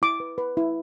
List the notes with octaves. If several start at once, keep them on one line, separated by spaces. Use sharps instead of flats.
E4 D6
B4
B4
E4